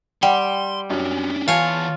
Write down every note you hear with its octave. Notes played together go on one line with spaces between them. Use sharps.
G3 F#5 G5 C6
F#2 C#4 D4
E2 F4 C#5 F5 G#5 A5